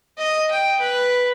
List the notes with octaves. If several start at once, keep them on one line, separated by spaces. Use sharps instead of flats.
D#5
G5
B4